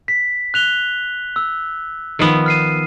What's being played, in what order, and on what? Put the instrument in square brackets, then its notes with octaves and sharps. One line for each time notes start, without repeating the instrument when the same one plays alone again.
[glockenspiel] B6
F#6 F7 G7
E6
[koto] D#3 F3 B3
[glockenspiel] F6 C7 D#7